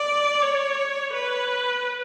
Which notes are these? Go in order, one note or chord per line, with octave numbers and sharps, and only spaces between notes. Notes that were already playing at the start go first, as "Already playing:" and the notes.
Already playing: D5
C#5
B4